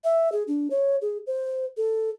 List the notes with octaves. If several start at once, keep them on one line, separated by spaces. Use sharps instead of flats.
E5
G#4
D4
C#5
G#4
C5
A4